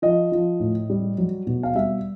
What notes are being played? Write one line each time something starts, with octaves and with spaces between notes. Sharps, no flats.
F3 D#5
F3
A2
G3
F#3
B2
F5
G3 E5